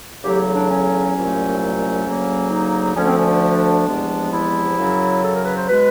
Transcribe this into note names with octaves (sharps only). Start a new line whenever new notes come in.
E2 C#3 F#3 A3 G4
D4
C#4
C2 A#2 F#3 A3
C#4
D2 C#3 F#3 A#3
D#4
D2 D3 F3 A3 C#4
C4
C#4
D4
D4
E2 C3 F3 G#3 B3
E4
F#2 C#3 F#3
A4
A#4
B4
C5
B2 G#3 B4